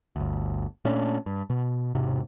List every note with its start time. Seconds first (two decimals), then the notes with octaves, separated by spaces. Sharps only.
0.16 G1 D2
0.85 A#2 A3 C#4 D4
1.26 G2
1.50 B2
1.95 E1 G#2 C3